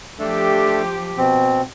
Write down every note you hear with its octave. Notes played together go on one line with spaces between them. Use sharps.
F3 A3 D4 G4 A4
B2 C4